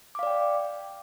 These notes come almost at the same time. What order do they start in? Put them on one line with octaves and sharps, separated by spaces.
D6 F5 D5 G5